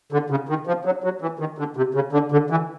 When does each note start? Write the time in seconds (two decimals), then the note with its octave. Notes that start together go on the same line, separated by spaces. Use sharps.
0.12 D3
0.30 C#3
0.49 D#3
0.67 F3
0.85 F#3
1.04 F#3
1.22 E3
1.39 D#3
1.58 D3
1.77 C3
1.95 C#3
2.13 D3
2.32 D3
2.50 E3